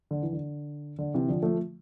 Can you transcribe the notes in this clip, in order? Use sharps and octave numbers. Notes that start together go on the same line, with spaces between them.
D3
E3
D3
D3
C3 E3
D3 F3
F3 A3